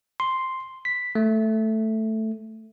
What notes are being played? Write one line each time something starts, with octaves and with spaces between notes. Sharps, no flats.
C6
B6
A3